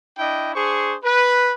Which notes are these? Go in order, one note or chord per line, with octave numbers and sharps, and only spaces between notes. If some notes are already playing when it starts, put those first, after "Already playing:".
D4 E4 D#5 G5
D4 G#4 C5 C#6
B4